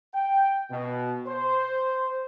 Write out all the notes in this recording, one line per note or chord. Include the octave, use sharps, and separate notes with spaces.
G5
B2
C5